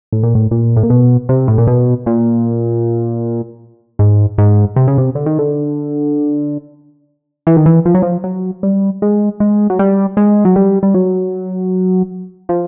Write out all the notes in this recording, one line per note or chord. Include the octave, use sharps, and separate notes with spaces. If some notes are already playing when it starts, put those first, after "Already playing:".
A2
A#2
A2
A#2
A2
A#2
B2
C3
A2
A#2
B2
A#2
G#2
G#2
C3
C#3
C3
D3
D#3
D3
E3
D#3
E3
F3
F#3
F3
F#3
G3
G#3
G#3
F#3
G3
G#3
F#3
G3
G3
F#3
F3